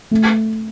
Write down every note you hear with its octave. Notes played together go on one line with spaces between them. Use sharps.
A3